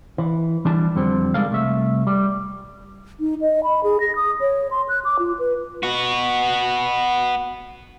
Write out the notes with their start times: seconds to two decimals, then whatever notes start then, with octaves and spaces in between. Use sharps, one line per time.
0.18 E3
0.65 E3 G3 D4 E4 A5
0.95 F2 D3 G3 C4
1.34 C#2 D#3 G3 G#3 A4 F5
1.51 C2 A3 E5
2.07 G3
3.20 D#4
3.41 D#5
3.64 B5
3.84 G#4
4.00 A#6
4.16 D#6
4.41 C#5
4.71 C6
4.89 F#6
5.05 D6
5.19 F4
5.39 B4
5.83 B3 F#4